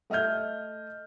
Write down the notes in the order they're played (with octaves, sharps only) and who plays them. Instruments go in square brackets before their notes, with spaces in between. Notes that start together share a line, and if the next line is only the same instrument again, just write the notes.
[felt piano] A3 D#5 E5 F6 G6